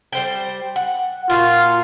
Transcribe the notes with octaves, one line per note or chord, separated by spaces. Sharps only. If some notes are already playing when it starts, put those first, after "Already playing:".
G3 C5 G5
F#5
A#2 F4 F#4